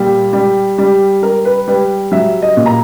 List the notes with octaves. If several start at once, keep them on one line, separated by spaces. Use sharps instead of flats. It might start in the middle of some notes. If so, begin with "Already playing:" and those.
Already playing: A#2 G3
G3
G3
G3 A#4
B4
G3 B4
F#3 E5
D#5
A#2
A#5